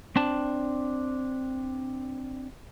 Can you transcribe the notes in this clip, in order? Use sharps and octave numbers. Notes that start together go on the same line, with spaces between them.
C4 D4 A5